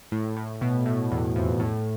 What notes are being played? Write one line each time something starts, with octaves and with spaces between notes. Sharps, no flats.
A2
A2
B2
A2
E2
F2
A2